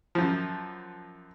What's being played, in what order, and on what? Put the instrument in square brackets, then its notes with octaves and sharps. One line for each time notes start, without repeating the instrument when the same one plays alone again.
[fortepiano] F#2 F3